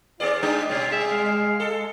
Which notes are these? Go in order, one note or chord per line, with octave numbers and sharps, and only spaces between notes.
E2 C4 F4 G#4 D5
G#3 D4 D#4 G#4
B2 G3 C#4 F4
G#4 E5
G#3 F5
A4